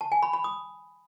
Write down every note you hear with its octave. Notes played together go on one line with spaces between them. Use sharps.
A5
G#5
B5
B5
D#6